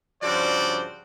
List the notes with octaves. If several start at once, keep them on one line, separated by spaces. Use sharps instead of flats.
G2 C#3 F3 F#4 C5 D5